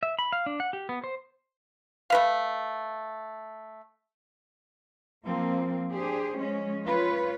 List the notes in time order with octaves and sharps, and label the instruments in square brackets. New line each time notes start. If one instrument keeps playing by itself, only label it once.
[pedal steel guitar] E5
B5
F5
D4
F#5
G4
B3
C5
[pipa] A3 B4 F5
[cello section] F3 A#3 C4
D4 G4 G#4 C5
F3 G#3 C#4
F4 B4 C#5